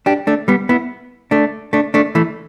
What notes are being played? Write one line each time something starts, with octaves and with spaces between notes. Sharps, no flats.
D4 G4
A3 D4
G3 B3
B3 E4
A3 D4
A3 D4
A3 D4
E3 A3